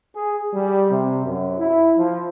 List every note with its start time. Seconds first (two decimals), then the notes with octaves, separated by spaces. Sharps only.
0.14 G#4
0.53 G3
0.90 C3
1.24 F#2
1.58 E4
1.97 F3